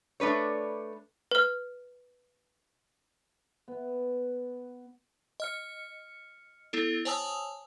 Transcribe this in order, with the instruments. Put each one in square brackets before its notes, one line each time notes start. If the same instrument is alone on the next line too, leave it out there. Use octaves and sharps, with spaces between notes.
[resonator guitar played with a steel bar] A3 D4 B4 C#5
[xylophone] B4 F6
[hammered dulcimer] B3
[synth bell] D#5 F6 C#7
B3 E4 A4
C5 C#5 G#5 A5 D#6 E6